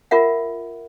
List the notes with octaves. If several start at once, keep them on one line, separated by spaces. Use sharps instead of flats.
F4 A#4 E5 F#5